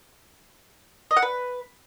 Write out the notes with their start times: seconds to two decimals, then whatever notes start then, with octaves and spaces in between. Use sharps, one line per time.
1.11 D#5
1.17 F#5
1.22 B4